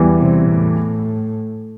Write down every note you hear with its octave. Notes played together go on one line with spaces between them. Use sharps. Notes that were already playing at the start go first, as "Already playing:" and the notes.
Already playing: E2 E3 G3
C3
A2